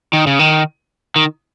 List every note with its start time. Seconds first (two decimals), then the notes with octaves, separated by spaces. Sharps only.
0.13 D#3
0.27 C#3
0.39 D#3
1.16 D#3